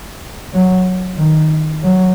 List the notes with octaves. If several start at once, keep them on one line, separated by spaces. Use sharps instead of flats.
F#3
D#3
F#3